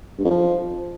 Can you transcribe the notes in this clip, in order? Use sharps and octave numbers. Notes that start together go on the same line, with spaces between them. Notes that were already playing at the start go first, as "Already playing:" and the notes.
G2
F2
F3